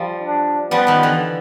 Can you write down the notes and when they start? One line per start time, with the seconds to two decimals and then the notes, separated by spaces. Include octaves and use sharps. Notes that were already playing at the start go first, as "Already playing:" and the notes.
Already playing: F3 G3
0.23 D4
0.71 F3 G3 B3
0.87 D#3 F3
1.03 D3 E3